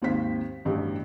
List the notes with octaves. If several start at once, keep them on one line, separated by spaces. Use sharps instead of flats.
G#1 D#2 C4 C5 B6
A1 G2 B2 G4